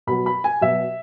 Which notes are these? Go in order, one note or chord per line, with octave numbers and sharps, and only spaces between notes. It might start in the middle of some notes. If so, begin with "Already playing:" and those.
B2 F#3 B5
B5
G#5
B2 F#3 E5